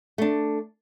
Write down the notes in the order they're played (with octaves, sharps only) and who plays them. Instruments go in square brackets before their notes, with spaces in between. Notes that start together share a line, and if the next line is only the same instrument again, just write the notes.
[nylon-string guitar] A3 D4